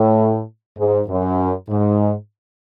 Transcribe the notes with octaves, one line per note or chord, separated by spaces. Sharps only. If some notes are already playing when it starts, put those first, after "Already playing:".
Already playing: A2
G#2
F#2
G#2